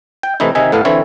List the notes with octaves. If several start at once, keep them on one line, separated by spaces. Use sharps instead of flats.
G5
C3 E3 A3 D#4 E4
C3 D#3 D#4 E5 G#5
A2 B3 A4 F5
D3 E3 C4 E4 C#5